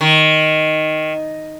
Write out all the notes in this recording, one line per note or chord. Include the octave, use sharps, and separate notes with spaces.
D#3